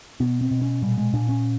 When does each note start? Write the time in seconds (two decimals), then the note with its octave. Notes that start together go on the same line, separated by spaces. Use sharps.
0.20 B2 B3
0.41 C4
0.51 B2
0.62 C#4
0.82 A#2 G3
0.98 G#3
1.13 A#2 D4
1.29 C#4